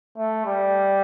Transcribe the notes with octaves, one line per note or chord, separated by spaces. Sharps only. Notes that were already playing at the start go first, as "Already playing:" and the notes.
A3
G3